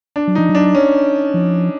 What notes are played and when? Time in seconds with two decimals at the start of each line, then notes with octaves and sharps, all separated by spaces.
0.16 D4
0.28 F#3
0.35 F3 D#4
0.49 F#3
0.55 D4
0.75 C#4
1.34 F3